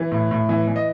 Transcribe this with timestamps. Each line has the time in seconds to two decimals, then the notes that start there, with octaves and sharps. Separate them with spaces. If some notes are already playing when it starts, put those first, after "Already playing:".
Already playing: E3
0.12 A2
0.31 A2
0.49 E3
0.67 E3
0.76 D#5